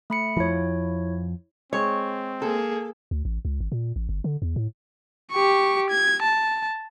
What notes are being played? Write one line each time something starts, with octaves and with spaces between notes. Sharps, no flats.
A3 B5 C#7
F2 F3 E4 C#5
G#3 C4 C#5
A#3 G#4 A4
D2
A1
C#2
G#1
A#2
A1
G1
D3
E2
A2
G4 C#6
G#6
A5